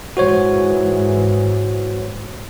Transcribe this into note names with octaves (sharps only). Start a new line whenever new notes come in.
G#2 E3 F#4 C5 C#5